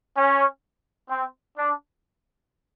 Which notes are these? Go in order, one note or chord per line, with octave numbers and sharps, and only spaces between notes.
C#4
C4
D4